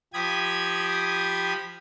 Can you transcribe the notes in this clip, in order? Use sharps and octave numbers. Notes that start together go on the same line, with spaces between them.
F3 G4 B5 D#6 G#6